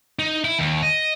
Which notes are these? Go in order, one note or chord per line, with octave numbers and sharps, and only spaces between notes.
D#4
E4
D#2
D#5